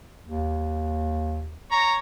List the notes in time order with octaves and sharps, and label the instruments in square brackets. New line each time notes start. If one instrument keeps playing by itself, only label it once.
[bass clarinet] D#2
[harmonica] C#5 A#5